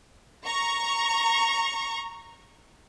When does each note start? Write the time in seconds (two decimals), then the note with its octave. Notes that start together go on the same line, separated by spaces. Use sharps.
0.44 A#5 C#6